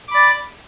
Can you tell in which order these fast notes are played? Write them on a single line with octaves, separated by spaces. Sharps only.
D6 B5 D5